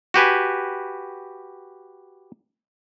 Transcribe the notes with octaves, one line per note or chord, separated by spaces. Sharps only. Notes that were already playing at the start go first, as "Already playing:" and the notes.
F#4 G4 B4 G#5